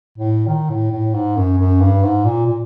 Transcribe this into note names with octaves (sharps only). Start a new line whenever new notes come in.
A2
D#3
A2
A2
G#2
F#2
F#2
G2
G#2
A#2
A#2